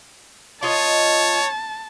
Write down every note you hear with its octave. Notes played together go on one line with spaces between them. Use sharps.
F4 C#5 D#5 A5